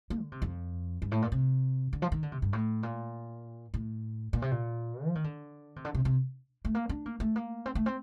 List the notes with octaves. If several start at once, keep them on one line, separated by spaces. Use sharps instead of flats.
A#3
D3
C3
F2
G2
A2
A#2
C3
D3
F3
D#3
D3
C3
G2
A2
A#2
A2
A#2
C3
A#2
F3
D#3
D3
C3
D3
C3
C3
A3
A#3
D4
A#3
A3
A#3
C4
A3
C4